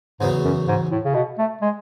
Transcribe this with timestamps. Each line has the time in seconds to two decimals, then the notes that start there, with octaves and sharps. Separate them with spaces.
0.20 E2 G#2 C#3 F#3 B3
0.45 F#2
0.68 G#2
0.91 A2
1.05 C#3
1.14 B2
1.38 A3
1.62 G#3